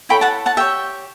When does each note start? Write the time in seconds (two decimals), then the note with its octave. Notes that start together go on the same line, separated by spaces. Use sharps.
0.09 E4 A4 C#5 G5 B5
0.21 F#5 A5
0.46 F#5 A5
0.57 G4 C#5 E5 G5